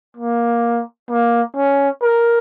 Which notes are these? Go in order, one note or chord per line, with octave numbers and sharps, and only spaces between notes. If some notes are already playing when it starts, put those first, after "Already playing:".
A#3
A#3
C#4
A#4